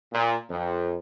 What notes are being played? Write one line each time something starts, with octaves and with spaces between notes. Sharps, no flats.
A#2
F2